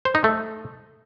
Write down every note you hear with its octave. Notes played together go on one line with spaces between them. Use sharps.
C5
D#4
A3